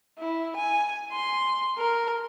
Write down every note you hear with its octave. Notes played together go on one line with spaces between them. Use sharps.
E4
G#5
C6
A#4